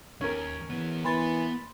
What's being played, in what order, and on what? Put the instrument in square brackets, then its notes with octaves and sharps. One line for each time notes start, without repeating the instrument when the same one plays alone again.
[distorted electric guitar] D#2 [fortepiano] C#4 A#4
[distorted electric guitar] E3 B3
[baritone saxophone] E3 [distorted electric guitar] B3 [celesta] B5 C6 A6